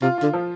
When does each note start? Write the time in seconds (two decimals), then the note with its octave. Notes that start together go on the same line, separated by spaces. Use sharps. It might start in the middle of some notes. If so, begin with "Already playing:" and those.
0.02 C3 F4
0.18 D3 F4
0.33 F3